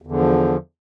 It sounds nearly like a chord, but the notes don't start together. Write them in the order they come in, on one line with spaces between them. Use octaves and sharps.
E2 D3 F3